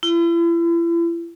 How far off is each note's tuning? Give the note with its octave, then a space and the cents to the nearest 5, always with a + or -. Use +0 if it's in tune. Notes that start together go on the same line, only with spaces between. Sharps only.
E4 +40